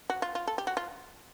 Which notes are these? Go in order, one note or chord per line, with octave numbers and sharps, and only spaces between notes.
F#4
F4
F4
A4
G4
F#4
F4